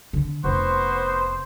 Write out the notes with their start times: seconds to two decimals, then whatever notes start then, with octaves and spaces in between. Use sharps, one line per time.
0.13 D3
0.44 F1 B3 F#4 C5